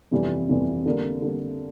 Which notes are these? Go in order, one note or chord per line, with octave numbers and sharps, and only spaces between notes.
G1 F2 C3 E3 G3
G1 F2 C3 E3 G3
D3 G3 A#3
D3 G3 A#3